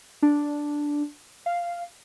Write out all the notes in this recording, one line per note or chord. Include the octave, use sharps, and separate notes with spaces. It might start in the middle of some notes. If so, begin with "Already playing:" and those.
D4
F5